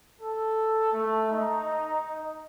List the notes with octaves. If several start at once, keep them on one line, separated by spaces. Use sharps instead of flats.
A4
A3
D#4